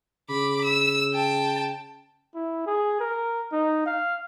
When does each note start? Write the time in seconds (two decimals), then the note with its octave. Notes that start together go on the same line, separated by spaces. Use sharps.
0.30 C#3 B5 D6
0.65 E6
1.14 G5 A5
2.35 E4
2.67 G#4
3.00 A#4
3.52 D#4
3.86 F5